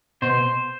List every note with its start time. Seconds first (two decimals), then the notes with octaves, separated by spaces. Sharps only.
0.22 B2 C5